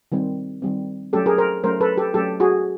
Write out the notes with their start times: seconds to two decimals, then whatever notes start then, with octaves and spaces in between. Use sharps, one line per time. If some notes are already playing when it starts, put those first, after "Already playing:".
0.12 D#3 G3 C4
0.62 D#3 G3 C4
1.13 F#3 A3 C#4 G4 A4
1.26 G#4 A#4
1.38 A#4 C5
1.64 F#3 A3 C#4 A#4 C5
1.81 A4 B4
1.97 G4 A4
2.14 F#3 A3 C#4 G4 A4
2.40 F#4 G#4